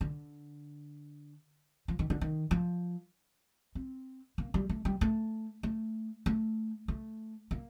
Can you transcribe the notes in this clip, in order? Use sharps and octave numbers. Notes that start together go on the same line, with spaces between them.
D3
F3
D#3
D3
D#3
F3
C4
A#3
G3
A3
G3
A3
A3
A3
A3
A#3